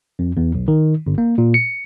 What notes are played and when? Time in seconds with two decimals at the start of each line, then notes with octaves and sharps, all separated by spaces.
0.19 F2
0.37 E2
0.55 B1
0.68 D#3
1.07 G1
1.18 A#3
1.38 A#2
1.54 C#7